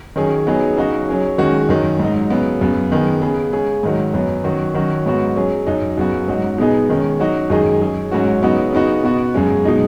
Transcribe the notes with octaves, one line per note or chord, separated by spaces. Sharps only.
D#3 F#3 C#4 G#4
F#3 B3 D#4 G#4
C#3 F#3 D#4 F#4
F#3 C#4 G#4
D#3 G#3 C#4 F#4
F#2 D#3 F#3
G#2 F#3 D#4
C#3 F#3 B3
F#2 C#3 B3
D#3 B3 G#4
C#3 B3 G#4
C#3 G#3 C#4 G#4
G#2 D#3 F#3
F#2 F#3 B3
D#3 F#3 C#4 F#4
D#3 F#3 C#4 F#4
G#2 F#3 B3 F#4
F#3 C#4 G#4
F#2 F#3 D#4
F#2 C#3 B3 F#4
G#2 F#3 D#4 F#4
B2 G#3 B3 D#4 G#4
D#3 G#3 C#4
F#3 D#4 F#4
F#2 D#3 G#3 D#4 G#4
F#3 C#4 G#4
G#2 F#3 C#4 F#4
C#3 F#3 B3 D#4 F#4
C#3 B3 D#4 F#4
B2 B3 F#4
F#2 C#3 G#3 C#4
B2 G#3 D#4